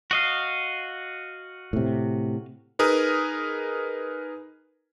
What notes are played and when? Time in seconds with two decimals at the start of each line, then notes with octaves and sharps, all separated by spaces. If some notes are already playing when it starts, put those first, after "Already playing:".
0.11 F#4 D#5 F5
1.73 A2 C3
2.79 D#4 G#4 A#4 B4 D#6